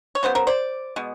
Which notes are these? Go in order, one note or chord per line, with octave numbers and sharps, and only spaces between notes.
C#5
C#3 F#3 B3 C5
A#4 C5
C5 D5
B2 G#3 B3